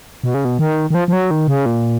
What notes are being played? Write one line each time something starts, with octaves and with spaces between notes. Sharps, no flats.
B2
C#3
B2
D#3
D#3
F3
F3
F#3
D#3
C#3
A#2